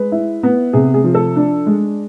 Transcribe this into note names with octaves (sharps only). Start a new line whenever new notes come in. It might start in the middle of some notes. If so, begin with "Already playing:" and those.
Already playing: G#3 B4
E4
B3
C3 G#4
G#4
F3
A4
D4
G#3